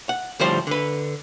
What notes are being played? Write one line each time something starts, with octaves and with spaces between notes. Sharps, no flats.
F#5
D2 A2 F3 G3 C5
D3 B4